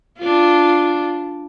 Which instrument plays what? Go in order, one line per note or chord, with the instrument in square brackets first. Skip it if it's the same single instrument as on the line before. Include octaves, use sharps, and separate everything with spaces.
[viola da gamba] D4 F4